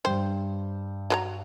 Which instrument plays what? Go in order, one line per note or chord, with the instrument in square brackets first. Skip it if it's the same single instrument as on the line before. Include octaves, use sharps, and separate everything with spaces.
[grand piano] G2 G5 [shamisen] C5
[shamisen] F#3 B4 A#5